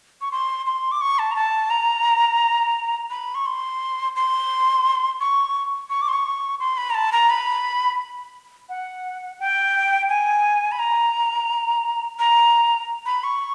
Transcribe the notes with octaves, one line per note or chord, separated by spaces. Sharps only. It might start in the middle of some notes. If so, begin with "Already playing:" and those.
C#6
C6
C6
D6
C#6
A5
A#5
A5
A#5
B5
C#6
C6
C6
C#6
C#6
D6
C6
C#6
C6
B5
A#5
A5
A#5
B5
F#5
G5
G#5
B5
A#5
A#5
B5
C#6